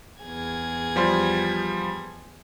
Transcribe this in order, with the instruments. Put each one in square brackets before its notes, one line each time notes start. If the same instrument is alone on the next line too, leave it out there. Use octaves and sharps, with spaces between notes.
[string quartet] E2 G#4 G#6
[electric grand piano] F3 G3 C6